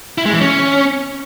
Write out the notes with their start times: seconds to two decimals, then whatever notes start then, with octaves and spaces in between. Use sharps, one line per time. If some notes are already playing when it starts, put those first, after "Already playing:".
0.18 E4
0.26 G#3
0.33 E3
0.41 C#4